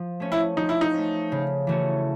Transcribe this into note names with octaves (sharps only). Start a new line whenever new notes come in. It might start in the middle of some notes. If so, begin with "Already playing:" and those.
Already playing: F3
A3 C#4
E4
F3 D#4
E4
D#4
A3 C#4
C#3
E3 A3 C#4 F#4